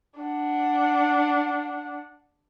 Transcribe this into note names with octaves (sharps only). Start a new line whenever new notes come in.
D4 F#5